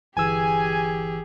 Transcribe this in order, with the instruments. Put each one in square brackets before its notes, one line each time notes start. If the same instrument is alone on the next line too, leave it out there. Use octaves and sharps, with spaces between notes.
[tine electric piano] G1 E3 E6 [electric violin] G4 G#4 [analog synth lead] G#5